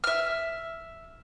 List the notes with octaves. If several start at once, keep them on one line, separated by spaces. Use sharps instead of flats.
E5 F6